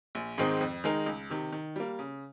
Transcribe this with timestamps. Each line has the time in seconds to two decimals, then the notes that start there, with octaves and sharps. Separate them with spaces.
0.15 A#1
0.38 G#2 D#3 G#3 C4
0.61 F2
0.84 D#3 G#3 D#4 A#4
1.06 C#2
1.30 C3 D#3
1.53 D#3
1.76 G3 A#3
1.99 C#3